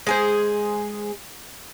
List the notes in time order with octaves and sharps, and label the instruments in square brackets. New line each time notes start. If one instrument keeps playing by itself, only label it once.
[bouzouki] G#3 G#4 C5